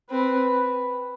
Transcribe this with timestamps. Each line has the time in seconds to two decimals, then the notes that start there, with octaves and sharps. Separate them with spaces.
0.11 C4 B4